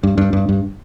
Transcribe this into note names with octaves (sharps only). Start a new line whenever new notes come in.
G2
G2
G2
G2